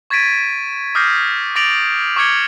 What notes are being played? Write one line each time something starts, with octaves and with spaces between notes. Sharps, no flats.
C#6 G#6 A6 B6 D7 D#7
D6 D#6 F6 G6 A#6 C7
D6 A6 A#6 D7 F7 F#7
C#6 D6 F6 G#6 C#7 G7